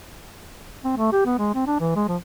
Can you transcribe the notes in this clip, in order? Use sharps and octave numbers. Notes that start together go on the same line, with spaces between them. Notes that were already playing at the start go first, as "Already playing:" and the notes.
C4
A3
G4
B3
G#3
C4
D4
E3
G#3
F3